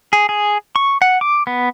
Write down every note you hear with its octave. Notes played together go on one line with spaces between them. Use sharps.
G#4
G#4
C#6
F#5
D6
B3